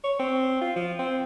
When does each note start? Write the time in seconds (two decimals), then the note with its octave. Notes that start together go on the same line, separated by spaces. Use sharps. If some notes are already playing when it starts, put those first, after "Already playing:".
0.04 C#5
0.20 C4
0.61 F4
0.76 F3
0.99 C4